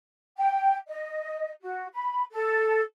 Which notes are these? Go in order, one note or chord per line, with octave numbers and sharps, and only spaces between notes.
G5
D#5
F#4
B5
A4